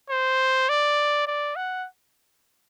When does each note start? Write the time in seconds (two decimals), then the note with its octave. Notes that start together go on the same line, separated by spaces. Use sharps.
0.10 C5
0.69 D5
1.27 D5
1.56 F#5